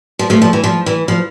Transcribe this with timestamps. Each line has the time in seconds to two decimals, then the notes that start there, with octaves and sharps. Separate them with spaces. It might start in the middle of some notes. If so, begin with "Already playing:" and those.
0.19 F3
0.30 F3 A3
0.42 F3
0.53 E3
0.64 F3
0.86 E3
1.08 F3